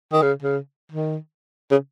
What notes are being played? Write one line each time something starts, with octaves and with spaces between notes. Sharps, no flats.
D#3
C#3
C#3
D#3
C#3